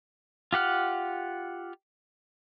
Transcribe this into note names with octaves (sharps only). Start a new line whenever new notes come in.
F4 G4 F#5 F6